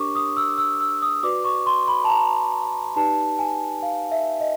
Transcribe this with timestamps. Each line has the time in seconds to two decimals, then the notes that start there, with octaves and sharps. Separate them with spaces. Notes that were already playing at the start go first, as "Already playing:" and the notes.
Already playing: D4 G4 A#4 C#5 C#6 D6
0.15 D#6
0.37 E6
0.58 E6
0.81 E6
1.02 D#6
1.23 F#4 B4 D5 D6
1.45 C#6
1.66 C6
1.88 B5
2.04 A5
2.10 A#5
2.96 D#4 G4 B4 D5 A5
3.39 G#5
3.82 F5
4.12 E5
4.40 D#5